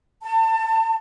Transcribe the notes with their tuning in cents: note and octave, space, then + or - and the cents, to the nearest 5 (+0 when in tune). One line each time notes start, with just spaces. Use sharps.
A5 +30